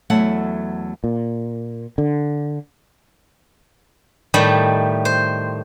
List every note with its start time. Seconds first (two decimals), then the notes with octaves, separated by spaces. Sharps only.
0.10 E2 F#3 A3 E5 F#5
1.04 A#2
1.98 D3
4.34 A2 D#3 G3 A3
5.05 C5